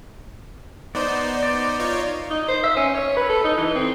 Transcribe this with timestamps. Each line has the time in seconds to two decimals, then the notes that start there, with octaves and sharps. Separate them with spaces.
0.95 B3 D#4 C5 D5
1.43 D5
1.79 D#4 F4 C#5
2.30 D#4
2.48 C5
2.63 E5
2.76 C#4
2.94 C#5
3.17 B4
3.29 A4
3.44 D#4
3.57 E3
3.75 C4